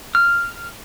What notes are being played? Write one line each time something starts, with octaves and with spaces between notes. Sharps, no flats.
F6